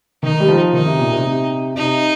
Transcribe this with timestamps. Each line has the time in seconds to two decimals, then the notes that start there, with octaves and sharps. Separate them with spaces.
0.23 D#3 D#4
0.40 G3
0.48 F3
0.73 D#3 D#4
0.86 C3
1.00 A#2
1.12 C3
1.25 C3
1.75 C3 D#4